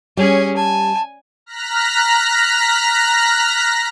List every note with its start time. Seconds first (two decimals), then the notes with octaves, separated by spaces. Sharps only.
0.17 G3 C#4 G#4 C#5
0.56 G#5 A5
1.46 A#5 F6 F#6 A#6 B6